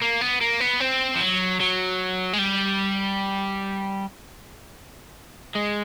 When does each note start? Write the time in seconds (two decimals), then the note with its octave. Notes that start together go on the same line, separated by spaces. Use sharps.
0.02 A#3
0.21 B3
0.41 A#3
0.60 B3
0.80 C4
1.16 F3
1.21 F#3
1.60 F#3
2.33 G#3
2.39 G3
5.56 G#3